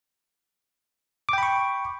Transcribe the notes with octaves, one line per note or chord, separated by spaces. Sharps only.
G5 B5 C#6 D6